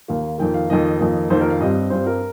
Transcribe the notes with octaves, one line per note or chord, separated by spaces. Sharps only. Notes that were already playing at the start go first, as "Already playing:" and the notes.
D#2 D#3 A#3 F5
F2 D#3 A#3 G5
F5
F2 D#3 A#3 D#5
F2 D#3 A#3
F2 D#3 A#3 C5
A#4
F5
G2 G3 C4 D#5
G2 G3 C4 C5
A#4